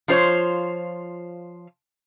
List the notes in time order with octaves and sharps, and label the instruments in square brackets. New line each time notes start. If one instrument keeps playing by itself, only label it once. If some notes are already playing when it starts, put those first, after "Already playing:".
[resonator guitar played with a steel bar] F3 F4 C5 C#5